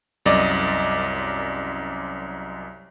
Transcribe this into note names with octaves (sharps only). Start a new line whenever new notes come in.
C2 F#2 D5 D#5